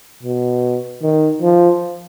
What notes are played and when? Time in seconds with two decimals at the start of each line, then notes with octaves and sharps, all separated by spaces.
0.23 B2
1.02 D#3
1.42 F3